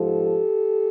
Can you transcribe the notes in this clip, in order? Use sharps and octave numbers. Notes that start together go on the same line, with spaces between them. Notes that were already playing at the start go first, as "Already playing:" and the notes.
Already playing: G#2 F3 G4 A4